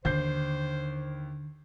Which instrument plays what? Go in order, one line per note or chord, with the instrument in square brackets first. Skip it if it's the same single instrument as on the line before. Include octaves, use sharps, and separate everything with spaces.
[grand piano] D#2 G6 C7 [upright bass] D3 [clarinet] C5